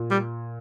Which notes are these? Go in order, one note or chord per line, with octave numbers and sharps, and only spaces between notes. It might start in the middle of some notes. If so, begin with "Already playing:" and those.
Already playing: A#2
G3